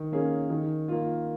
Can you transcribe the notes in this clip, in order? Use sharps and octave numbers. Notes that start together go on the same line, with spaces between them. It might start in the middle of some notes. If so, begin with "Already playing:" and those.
Already playing: D#3
A#3 C#4 G#4
D#3
A#3 F4